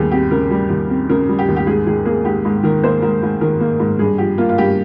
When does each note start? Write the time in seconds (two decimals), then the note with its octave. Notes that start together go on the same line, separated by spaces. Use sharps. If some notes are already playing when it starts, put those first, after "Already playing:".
Already playing: D#2 G3 G4 G#4
0.12 C4 G4
0.31 C#3 A#4
0.51 G3
0.70 D#2
0.90 C4
1.10 C#3 A#4
1.29 G3
1.39 G4
1.48 D#2
1.56 G4
1.66 G#2 G#4
1.86 D#3 G#4
2.05 A#3 G#4
2.25 G#2 G4
2.45 G#2 G#4
2.63 D#3 A#4
2.83 A#3 C5
3.02 G#2 A#4
3.23 G#2
3.41 D#3 A#4
3.60 A#3
3.80 G#2
3.99 G2 G#4
4.18 F3 G4
4.38 A#3 F4
4.49 F4
4.58 G2 G4